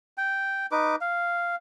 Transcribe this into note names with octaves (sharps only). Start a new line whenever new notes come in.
G5
D#4 B4 D6
F5